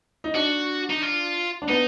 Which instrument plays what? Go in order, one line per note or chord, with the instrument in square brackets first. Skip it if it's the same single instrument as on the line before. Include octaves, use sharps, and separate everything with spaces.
[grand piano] D#4
[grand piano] D4 [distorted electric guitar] F#4
[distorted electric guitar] D#4
F4
[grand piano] D4
[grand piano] B3 [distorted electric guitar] D#4